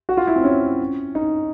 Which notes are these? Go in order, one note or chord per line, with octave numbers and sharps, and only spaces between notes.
F#4
F4
E4
C4
C#4
D#4